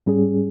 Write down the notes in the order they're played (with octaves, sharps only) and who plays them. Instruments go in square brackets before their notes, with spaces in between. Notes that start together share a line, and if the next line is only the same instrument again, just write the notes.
[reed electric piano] G#2 G3 C#4 G#4